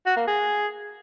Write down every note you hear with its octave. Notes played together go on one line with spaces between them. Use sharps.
F#4
A#3
G#4